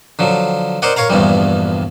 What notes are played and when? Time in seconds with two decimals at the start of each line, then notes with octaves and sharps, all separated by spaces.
0.19 D3 F3 F#3
0.82 A#4 C5 D5 D#5 F#5
0.96 A#4 C#5 F5 A#5
1.10 A#1 E2 G2 F3 G3